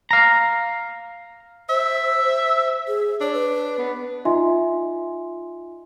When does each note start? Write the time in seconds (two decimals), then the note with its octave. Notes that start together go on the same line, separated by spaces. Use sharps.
0.11 F5 A#5
1.69 C5 E5
2.88 G#4
3.21 D4 C#5
3.34 B4
3.78 B3
4.25 D#4 F4 D#5 E5 G#5 C6